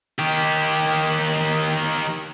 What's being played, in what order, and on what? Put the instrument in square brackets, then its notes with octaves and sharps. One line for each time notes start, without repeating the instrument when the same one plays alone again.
[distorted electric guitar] D#3 G4